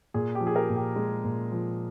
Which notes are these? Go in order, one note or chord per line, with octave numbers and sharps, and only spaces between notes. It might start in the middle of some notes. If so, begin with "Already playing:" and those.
A#2 G#4
G4
F3
G#4
G4 A#4
A#2
G4
G#3
A#2
F3